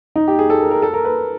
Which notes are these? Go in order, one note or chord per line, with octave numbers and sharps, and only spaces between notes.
D#4
G4
G#4
A4
A#4
A#4
A4
A#4
B4